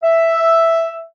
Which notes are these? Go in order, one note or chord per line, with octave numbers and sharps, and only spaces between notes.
E5